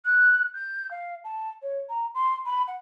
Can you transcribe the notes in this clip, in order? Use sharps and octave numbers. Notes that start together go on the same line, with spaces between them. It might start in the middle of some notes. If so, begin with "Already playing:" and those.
F#6
G6
F5
A5
C#5
A#5
C6
B5
F#5